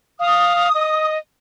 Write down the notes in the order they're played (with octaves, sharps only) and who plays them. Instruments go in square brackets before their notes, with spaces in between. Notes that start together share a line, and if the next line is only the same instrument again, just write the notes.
[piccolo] F5 [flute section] D#6
[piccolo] D#5